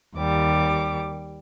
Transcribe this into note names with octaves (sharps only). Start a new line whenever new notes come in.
D#2 G3 D6